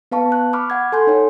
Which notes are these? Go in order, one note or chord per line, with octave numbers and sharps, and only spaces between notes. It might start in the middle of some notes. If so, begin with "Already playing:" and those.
B3 B4 F5 A5 C#6
F#6
B5 C#6 D6 F6
F#5 G#6
A4 G#5 C6 G6
D#4 C#5 G5